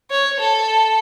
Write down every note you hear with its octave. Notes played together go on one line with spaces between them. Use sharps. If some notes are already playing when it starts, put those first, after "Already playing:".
C#5
A4